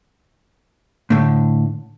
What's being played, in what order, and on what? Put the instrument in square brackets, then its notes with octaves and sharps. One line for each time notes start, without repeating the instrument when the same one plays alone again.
[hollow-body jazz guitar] A2 D3